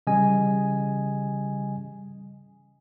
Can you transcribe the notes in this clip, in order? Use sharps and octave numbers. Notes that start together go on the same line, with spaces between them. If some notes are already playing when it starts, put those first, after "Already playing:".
C#3 E3 G3 D#5 G#5